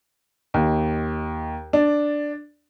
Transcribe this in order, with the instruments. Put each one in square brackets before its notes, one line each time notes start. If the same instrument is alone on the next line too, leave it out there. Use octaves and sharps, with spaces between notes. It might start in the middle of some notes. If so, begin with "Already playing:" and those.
[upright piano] D#2
D4